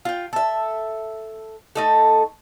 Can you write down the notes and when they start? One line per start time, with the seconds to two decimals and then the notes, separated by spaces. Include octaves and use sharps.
0.05 F4 G5
0.33 A4 E5
1.75 A3 D#4 A4